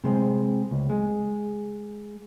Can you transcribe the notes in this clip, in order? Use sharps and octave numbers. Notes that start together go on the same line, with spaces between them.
C3 G#3 C4
C#2
G#3